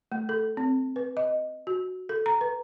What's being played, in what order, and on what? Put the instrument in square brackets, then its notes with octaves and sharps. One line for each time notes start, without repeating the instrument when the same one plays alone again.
[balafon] A3
A4
C4
B4
D#5
F#4
A4
A#5
B4